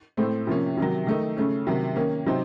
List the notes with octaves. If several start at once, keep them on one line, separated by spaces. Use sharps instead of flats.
A2 A3 C4
C3 F3 A#3 C#4
C3 D#3 F#3
D#3 A3 D#4
C#3 A3 C#4
C3 D#3 F#3
D#3 A#3 C#4
C3 F#3 C4 D#4